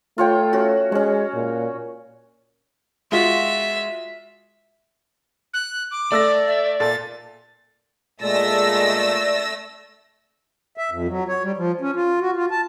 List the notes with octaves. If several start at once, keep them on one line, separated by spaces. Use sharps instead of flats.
A3 F4 C#5 G5
C#4 F#4
G#3 C#4 C#5
A#2
G#3 F4 F#4 E5
F#6
D6
A3 D5 E6 A#6
E5
A#2 A4 A6
A#2 G#3 A3 D5 E6 A#6
E5
F2
F#3
C#5
G3
F3
C#4
F4
F#4
F4
A5